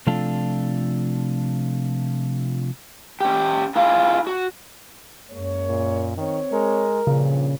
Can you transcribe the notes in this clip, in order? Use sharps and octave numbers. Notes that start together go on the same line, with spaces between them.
C3 F3 A3 D4 F4 A4
C#4 G4
E4 F4 G#4 F5
F#4
F#2 G#3 A#3 C#5
A#2
D#3 C4 C#5
G#3 A#4
G2 A#2 C#3 F3